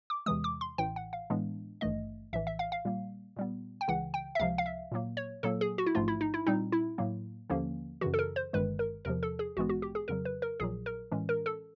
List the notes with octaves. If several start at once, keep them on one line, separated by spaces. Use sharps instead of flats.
D6
E2 C3 E3 G#3 D#6
D6
C6
A1 A2 E3 G5
F#5
F5
A2 E3 G#3 B3 D4
G#1 G2 E3 A3 D#5
A#1 A2 E3 E5
E5
F5
F5
A#2 G3 A#3
A#2 G3 B3
G5
C#2 C#3 E3 F#5
G5
E5
C#2 C3 F3 F5
F5
E5
A#2 F#3 A#3
C#5
A#2 F#3 A#3 A4
G#4
F#4
E4
A1 G#2 F3 A3 F4
E4
D#4
E4
A#2 G3 C4 D#4
E4
A2 F#3 A#3
D#2 D3 F3 A#3 C#4
F#2 C#3 E3 F#4
A4
A#4
C5
G1 G2 D#3 G#3 B4
A#4
E2 C3 F3 A#4
A4
G#4
A#1 G#2 E3 G#3 B3 F#4
F#4
G4
G#4
F2 C#3 F#3 A#4
B4
A#4
A#1 A#2 F#3 G#4
A#4
A2 E3 G#3 C#4
A#4
A4